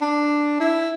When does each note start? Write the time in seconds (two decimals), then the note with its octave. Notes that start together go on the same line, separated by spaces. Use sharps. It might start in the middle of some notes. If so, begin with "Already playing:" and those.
0.01 D4
0.60 E4